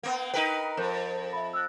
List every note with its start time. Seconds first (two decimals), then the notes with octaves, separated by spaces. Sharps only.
0.03 A#3 B3
0.34 D#4 A#4 B4 G5 D#7
0.77 F2 A#4 C5 G6
1.33 E5 B5
1.53 E6 F#6